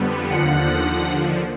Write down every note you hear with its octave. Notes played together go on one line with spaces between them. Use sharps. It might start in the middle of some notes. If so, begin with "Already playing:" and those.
Already playing: F2 D3 G3 B3
D#2 D3 F3 F#5